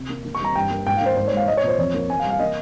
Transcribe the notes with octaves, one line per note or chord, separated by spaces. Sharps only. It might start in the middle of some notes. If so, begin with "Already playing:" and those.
Already playing: C3
A#3
A#3
C#6
G3 A#5
G2 G5
A#3
G#2 G5
A#3 F5
C5
G#2 C5
C#5
G#3 F5
G#3 D#5
C#5
A#2 C5
F2 C#5
A#3
A#3 G#5
F5
G3
F5
A#3 D#5